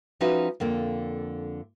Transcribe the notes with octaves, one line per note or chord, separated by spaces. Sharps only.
F3 C#4 D#4 F#4 B4 E5
F2 D3 A#3